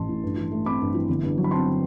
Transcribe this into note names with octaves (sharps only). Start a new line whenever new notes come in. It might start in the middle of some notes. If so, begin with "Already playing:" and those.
Already playing: A1 A5 C6
A2
G2
E3
A3
C4 B5 D6
G2
E3
G1
G2
F#3
B5
C4 A5 C6